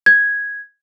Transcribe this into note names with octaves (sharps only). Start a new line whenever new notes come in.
G#6